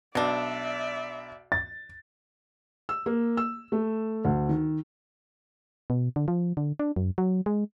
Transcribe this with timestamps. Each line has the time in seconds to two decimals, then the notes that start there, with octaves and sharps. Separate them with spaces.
0.15 B1 B2 D4 D5 E5
1.52 A6
2.89 E6
3.06 A#3
3.37 E6
3.72 A3
4.25 D2
4.49 D#3
5.90 B2
6.16 D3
6.28 F3
6.57 D3
6.79 D4
6.96 F#2
7.18 F#3
7.46 G#3